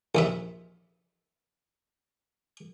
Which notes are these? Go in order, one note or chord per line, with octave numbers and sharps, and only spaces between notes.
A#1 D#2 E5